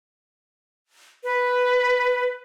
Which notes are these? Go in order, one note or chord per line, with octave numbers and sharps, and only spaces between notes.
B4